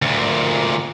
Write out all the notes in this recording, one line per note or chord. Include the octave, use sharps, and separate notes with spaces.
D2 A#2